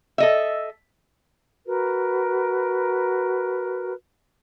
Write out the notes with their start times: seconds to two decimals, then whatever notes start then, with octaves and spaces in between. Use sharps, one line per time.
0.18 A4 D#5 E5
1.66 F#4 A#4 B4